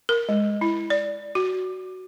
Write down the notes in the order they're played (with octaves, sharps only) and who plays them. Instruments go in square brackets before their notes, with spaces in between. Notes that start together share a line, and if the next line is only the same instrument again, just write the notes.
[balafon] A#4
G#3
E4
D5
F#4